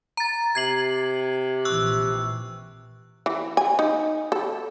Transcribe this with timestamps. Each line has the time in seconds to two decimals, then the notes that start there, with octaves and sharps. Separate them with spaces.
0.17 A#5 A6
0.55 C3 G#6 C7 F#7
1.65 A#1 A#2 E3 C#6 E6 F#6
3.26 E3
3.57 G#5
3.79 D#4
4.32 A4